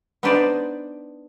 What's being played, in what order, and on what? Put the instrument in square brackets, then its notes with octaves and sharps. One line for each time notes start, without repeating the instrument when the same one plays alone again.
[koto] B3 D4 D#4 B4 C5 D5